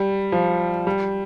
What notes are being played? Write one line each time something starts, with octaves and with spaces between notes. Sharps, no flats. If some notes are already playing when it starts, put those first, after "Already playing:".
Already playing: G3
F3
G3